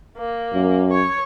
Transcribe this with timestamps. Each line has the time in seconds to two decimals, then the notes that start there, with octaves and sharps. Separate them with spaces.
0.18 A#3
0.54 F#2
0.92 C#5